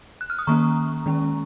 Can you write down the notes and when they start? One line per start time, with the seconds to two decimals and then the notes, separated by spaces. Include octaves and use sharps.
0.21 F#6
0.30 F6
0.39 D#6
0.47 D#3 A#3 C#4 A#5 C#6
1.06 D#3 G#3 C#4